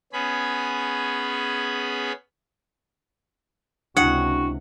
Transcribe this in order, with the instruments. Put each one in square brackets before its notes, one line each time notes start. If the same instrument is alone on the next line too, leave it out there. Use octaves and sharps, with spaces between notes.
[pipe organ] B3 C#4 G#4 B5
[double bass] C#2 C3 [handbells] D4 E4 [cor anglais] F#4 [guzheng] F#5